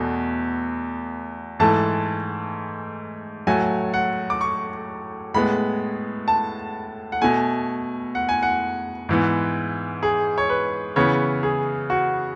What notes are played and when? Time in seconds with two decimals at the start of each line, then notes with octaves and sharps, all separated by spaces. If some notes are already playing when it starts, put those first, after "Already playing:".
Already playing: E2 B2 A3
1.60 G#2 E3 A3 A5
3.47 A2 F#3 A3 G#5
3.94 F#5
4.30 D6
4.41 C#6
5.34 A2 G#3 B3 B5
6.28 A5
7.12 F#5
7.22 B2 A3 G#5
8.15 F#5
8.29 G#5
8.43 F#5
9.09 G#2 E3 B3
10.03 G#4
10.38 C#5
10.50 B4
10.96 C#3 E3 B3 C#5
11.43 G#4
11.90 F#4